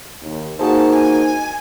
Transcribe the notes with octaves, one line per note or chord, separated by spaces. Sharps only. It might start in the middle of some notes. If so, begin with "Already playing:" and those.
D#2
A#3 D#4 F#4 G#4 C5 A5
G#5